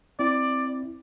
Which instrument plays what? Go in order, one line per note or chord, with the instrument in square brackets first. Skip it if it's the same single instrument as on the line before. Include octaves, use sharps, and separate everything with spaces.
[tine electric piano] C4 E4 [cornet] D5